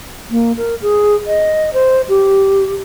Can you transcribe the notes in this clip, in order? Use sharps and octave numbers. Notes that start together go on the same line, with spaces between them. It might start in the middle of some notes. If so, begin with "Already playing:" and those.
A#3
A#4
G#4
D#5
C5
G4